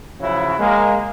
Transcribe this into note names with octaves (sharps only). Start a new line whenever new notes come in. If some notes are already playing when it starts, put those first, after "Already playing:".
C#3 F3 F#3 E4 F#4 G#4
G#3 A#3